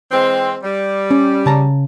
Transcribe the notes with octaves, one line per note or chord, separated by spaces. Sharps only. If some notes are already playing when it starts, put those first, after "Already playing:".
E3 G#3 C4
G3
C#4
C#3 A5 A#5